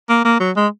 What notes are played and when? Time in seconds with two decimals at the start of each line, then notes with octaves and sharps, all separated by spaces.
0.09 A#3
0.25 A#3
0.40 F#3
0.56 G#3